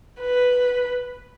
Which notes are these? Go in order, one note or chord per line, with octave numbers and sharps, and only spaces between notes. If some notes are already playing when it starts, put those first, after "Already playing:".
B4